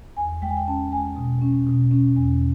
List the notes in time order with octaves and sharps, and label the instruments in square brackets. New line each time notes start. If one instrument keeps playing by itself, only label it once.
[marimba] E2 G#5
G#3 G5
G#5
G5
C#4 A5
G#3 G#5
B2
C#4
B2
C#4
E2